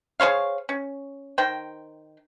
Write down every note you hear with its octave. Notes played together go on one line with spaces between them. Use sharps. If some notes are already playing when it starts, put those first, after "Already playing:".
G#4 C5 C#5 F5
C#4
D#3 C5 G5